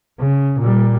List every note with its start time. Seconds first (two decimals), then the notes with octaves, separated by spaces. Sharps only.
0.20 C#3
0.60 A#2 G3